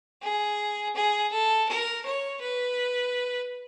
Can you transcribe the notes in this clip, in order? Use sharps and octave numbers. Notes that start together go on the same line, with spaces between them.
G#4
G#4
A4
A#4
C#5
B4